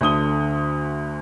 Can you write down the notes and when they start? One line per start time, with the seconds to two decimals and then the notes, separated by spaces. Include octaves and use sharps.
0.01 D2 D3 D#6 G7